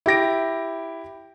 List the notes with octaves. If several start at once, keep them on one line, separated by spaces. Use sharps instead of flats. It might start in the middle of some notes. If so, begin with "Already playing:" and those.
E4 G4 A#6 D7